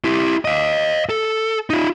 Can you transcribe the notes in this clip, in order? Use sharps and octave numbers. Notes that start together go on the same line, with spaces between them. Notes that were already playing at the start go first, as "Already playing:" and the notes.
E4 G4
D#5 F5
A4
D#4 F4